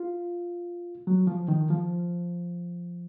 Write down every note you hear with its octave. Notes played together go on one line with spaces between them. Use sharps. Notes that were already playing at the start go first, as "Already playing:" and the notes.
Already playing: F4
F#3
F3
D#3
F3